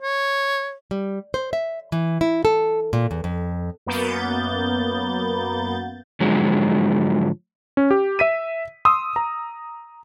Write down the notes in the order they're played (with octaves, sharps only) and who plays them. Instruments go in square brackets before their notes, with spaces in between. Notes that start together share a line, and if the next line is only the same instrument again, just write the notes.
[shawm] C#5
[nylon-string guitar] G3
C5
E5
E3
E4
A4
A#2
E2
F2
[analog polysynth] F#2 A#3 B3 G6 A6
[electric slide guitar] G#2 D3 F3 F#3 G#3
[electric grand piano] C#4
G4
E5 B6 D#7
C6 D#6 E6
A#5